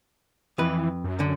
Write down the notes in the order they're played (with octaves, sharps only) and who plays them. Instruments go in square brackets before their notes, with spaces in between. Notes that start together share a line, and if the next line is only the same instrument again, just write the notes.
[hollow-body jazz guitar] F2 B4 [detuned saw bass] E3
[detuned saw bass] F#2
[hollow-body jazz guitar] D3